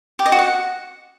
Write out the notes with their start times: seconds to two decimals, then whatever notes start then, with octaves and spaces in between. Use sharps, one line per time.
0.19 G4
0.26 D#5
0.32 F#4
0.39 F#5